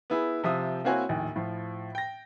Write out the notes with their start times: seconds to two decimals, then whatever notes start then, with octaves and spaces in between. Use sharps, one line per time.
0.10 B3 E4 G#4
0.43 C3 F3 E5 D#6
0.84 A#3 C4 E4 F#4 C#5 G#5
1.09 A#1 D#2 A2
1.36 A2 F3
1.95 G5 A#6